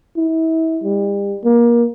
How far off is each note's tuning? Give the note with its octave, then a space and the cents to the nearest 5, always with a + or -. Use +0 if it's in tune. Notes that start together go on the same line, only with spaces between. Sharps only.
E4 -35
G3 +35
A#3 +25